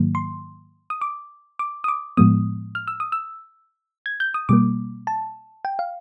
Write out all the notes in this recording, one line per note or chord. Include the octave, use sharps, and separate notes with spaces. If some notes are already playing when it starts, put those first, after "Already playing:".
Already playing: G#2 D#3 F#3 A#3
C6
D#6
D6
D6
D#6
D6
A2 F3 G#3 B3 D#6
F6
E6
D#6
E6
G#6
G6
D#6
B2 G3 A#3 D6
A5
G5
F5